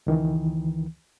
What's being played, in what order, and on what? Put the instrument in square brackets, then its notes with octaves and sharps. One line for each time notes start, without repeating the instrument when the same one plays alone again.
[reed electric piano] C#2 D#3 E3